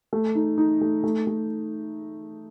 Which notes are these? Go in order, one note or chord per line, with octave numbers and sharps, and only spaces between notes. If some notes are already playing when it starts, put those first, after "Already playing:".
A3
D#4
D#4
A3
A3
A3